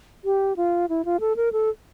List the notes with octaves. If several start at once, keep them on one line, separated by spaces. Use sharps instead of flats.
G4
F4
E4
F4
A4
A#4
A4